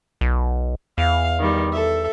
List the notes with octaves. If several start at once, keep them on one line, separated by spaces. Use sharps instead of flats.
B1
E2 F5
D#3 G3
A4 E5